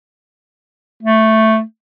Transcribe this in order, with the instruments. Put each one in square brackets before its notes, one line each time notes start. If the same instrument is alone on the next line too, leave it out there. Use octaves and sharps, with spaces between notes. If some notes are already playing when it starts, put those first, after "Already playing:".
[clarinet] A3